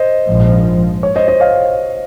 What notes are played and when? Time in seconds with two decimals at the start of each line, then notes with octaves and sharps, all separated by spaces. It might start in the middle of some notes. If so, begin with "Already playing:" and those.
Already playing: C5 D#5
0.27 A#1 G#2 F3
1.03 C#5
1.16 C5 D#5
1.28 C5 D#5
1.40 C#5 F5